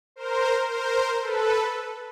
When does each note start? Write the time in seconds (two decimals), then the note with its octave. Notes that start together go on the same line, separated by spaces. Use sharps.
0.16 A#4 C5
0.69 A#4 C5
1.21 A4 B4